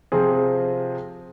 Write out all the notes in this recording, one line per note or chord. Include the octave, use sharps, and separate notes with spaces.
C3 F3 C4 F4 G#4